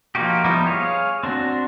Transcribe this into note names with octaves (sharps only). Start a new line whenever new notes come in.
F3 A#3 D#4 F#4 G4
F3 G3 B3 D#4 E4
G#4 C#5 F5
C4 D4 F#4